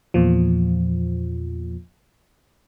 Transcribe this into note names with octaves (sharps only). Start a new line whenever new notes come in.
E2 A#2 F3